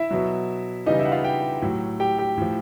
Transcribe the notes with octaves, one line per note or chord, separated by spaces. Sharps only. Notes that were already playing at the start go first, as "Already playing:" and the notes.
Already playing: E4 E5
B2 F#3
C#3 E3 G3 D#4 D#5
E4 E5
F#5
F4 F5
G4 G5
A2 F#3
G4 G5
G4 G5
A2 F3